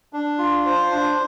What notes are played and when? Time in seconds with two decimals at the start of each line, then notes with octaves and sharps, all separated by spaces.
0.13 D4
0.38 F4
0.66 C5
0.90 D4